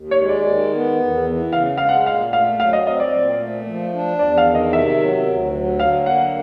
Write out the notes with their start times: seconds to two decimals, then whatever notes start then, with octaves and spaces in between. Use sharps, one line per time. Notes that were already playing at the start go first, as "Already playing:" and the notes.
Already playing: D#2
0.11 C#5
0.20 G#3
0.29 D5
0.47 D#3
0.74 B3
1.00 E2
1.26 E3
1.53 C#3 F5
1.78 G#3 F5
1.89 F#5
2.06 A#2 F5
2.33 A3 F5
2.59 F#3 F5
2.73 D#5
2.86 C4 D#5
3.00 D5
3.13 A#2
3.40 A3
3.67 F3
3.93 D4
4.19 E2 D5
4.38 F5
4.46 D#3
4.55 D#5
4.73 C3 E5
4.99 F#3
5.27 D2
5.53 F#3
5.79 D3 F5
6.06 A#3 F#5